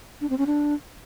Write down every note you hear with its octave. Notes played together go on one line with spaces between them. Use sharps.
D4
C4
C#4
D4